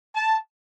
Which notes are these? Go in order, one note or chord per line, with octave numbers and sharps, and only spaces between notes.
A5